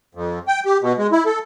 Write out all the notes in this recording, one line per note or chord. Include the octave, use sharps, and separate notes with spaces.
F2
G5
G4
B2
G#3
E4
A4